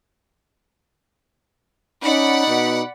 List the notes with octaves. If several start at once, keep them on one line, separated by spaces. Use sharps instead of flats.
C#4 D#4 D5 F#5 B5
B2